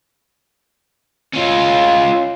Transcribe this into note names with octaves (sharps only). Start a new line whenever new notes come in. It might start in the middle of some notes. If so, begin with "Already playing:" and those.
C#4 F4